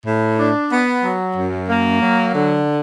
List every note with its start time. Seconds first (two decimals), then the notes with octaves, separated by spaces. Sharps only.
0.06 A2
0.39 D4
0.72 B3
1.04 F#3
1.37 F#2
1.70 A#3
2.02 F#3
2.35 D3